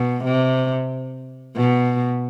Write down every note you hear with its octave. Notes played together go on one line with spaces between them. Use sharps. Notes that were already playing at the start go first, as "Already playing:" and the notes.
Already playing: B2
C3
B2